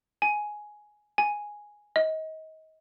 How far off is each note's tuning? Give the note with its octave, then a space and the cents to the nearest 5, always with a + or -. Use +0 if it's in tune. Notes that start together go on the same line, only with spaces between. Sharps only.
G#5 +10
G#5 +0
D#5 +30